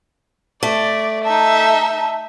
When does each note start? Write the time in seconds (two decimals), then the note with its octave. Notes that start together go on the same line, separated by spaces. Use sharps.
0.63 A3 D5
1.24 D#4 E5 A5